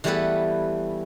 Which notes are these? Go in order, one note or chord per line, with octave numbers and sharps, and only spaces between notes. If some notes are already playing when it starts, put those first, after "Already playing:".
E3 G3 A3 B3 A4 B4